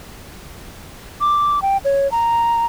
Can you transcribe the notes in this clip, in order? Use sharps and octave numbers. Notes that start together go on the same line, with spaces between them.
D6
G5
C#5
A#5